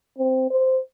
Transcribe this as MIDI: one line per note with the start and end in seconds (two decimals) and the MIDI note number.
0.19 0.46 60
0.50 0.79 72